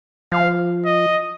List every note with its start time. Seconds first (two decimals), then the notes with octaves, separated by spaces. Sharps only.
0.32 F3 F5
0.85 D#5